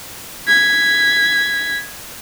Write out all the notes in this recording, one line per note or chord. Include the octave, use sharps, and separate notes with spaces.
G#6 B6